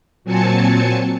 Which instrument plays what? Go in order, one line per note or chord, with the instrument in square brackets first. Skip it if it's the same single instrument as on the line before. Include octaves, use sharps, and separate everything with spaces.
[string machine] A#2 F#3 C4 G#5 A5 C#7